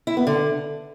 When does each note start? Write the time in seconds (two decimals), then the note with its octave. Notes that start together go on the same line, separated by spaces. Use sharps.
0.07 E4
0.17 B3
0.27 D3